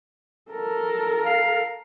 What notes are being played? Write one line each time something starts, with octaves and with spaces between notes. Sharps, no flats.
A4 A#4
F5